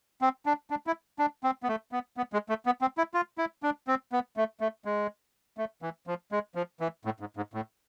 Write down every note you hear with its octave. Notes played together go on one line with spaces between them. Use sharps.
C4
D4
D4
E4
D4
C4
B3
A3
B3
B3
G#3
A3
B3
C4
E4
F4
E4
D4
C4
B3
A3
A3
G#3
A3
E3
F3
G#3
F3
E3
A2
G#2
G#2
A2